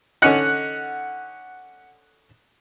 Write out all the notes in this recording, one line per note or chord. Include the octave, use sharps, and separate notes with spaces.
D3 C#4 D#4 F#5 F#6 C#7